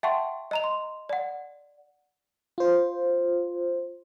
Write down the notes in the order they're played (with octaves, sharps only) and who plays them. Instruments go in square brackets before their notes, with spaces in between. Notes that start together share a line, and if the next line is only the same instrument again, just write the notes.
[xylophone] E5 F#5 G5 A5 C6 C#6
D#5 A#5 F7
C6
D5 F#5
[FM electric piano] F4 C5